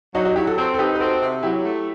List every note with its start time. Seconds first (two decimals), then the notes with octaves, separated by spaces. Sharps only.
0.15 F#3 D#4 F#4
0.25 D#4 F#4
0.36 F#3 E4 G4
0.47 F#4 A4
0.58 C4 A4 C5
0.74 A4
0.78 D#4 G4 B4
0.95 B4
1.00 C4 F#4 A4
1.22 C3
1.43 F#3 E4 G4
1.64 A3